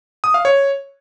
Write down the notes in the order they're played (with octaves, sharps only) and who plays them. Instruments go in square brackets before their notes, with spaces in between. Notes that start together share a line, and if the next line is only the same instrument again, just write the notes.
[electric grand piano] D#6
F5
C#5